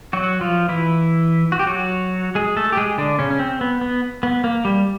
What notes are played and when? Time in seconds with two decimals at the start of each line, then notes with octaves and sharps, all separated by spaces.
0.13 F#3 F#4
0.41 F3 F4
0.69 E3 E4
1.52 F#4
1.59 G4
1.67 F#3 F#4
2.35 G#3 G#4
2.56 A3 A4
2.72 G4
2.77 G#3 G#4
2.98 D3 D4
3.19 C#3 C#4
3.30 C#4
3.39 C4
3.61 B3
3.81 B3
4.23 B3
4.44 A#3
4.65 G3